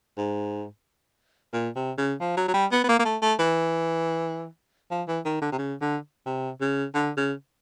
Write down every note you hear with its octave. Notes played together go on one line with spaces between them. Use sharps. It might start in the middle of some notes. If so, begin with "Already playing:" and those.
G#2
A#2
C3
C#3
F3
F#3
F#3
G3
B3
B3
A#3
A#3
A3
A3
E3
F3
E3
D#3
D3
C3
C#3
D3
C3
C#3
D3
C#3